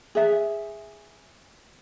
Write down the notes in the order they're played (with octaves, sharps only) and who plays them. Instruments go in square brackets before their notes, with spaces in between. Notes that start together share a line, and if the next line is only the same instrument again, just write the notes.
[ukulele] G#4 E5